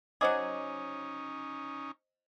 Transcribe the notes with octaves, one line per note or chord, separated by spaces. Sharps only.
F#3 C#4 D#4 F#4 G#4 C5 D#5 D6